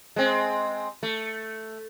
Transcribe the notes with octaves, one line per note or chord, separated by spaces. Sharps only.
G#3 C4
A3